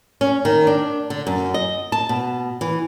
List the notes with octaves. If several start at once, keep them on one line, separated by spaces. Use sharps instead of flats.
C#4
D#3
D4
D3
F#2
D#5
A5
B2
E3